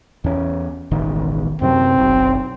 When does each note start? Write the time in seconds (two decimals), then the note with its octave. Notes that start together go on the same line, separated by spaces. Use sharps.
0.24 E2 C#4
0.91 E1 A1 D#3
1.62 F#2 C3 F#3 C4
1.99 F#1 B1